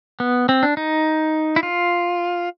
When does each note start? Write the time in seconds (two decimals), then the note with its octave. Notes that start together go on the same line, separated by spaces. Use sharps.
0.20 B3
0.49 C4
0.63 D4
0.77 D#4
1.56 E4
1.63 F4